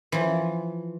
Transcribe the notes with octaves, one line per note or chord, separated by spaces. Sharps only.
E3 F3